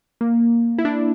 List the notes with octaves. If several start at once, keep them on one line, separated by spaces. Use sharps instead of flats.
A#3
E4
D4